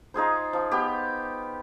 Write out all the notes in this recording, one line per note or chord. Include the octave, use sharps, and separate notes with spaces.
D#4 F4 G#4 C5
F3
B3 G4